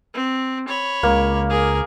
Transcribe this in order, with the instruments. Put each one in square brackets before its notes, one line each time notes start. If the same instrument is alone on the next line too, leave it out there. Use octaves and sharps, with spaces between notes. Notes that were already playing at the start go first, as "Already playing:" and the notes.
[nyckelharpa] C4
C#5 B5
[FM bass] C#2 [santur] A#3
[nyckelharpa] G#4 A#4